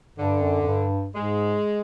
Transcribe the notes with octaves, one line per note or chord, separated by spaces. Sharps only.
G2 D3
F#2
F#2
G2
G#2 G#3